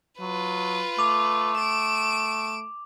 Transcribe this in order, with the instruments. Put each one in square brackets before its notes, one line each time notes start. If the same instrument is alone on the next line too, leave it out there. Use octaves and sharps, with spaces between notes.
[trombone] F#3 [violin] F4 B4
[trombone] A3 [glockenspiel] D6 F7
[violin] D7 E7